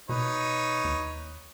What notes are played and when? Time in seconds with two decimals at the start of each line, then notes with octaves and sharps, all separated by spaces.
0.09 B2 D#4 B4 C#5
0.84 D#2